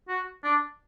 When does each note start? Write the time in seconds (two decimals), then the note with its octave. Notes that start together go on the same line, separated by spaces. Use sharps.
0.08 F#4
0.44 D4